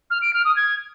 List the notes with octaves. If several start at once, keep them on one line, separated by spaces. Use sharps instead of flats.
F6
D7
F6
D#6
G#6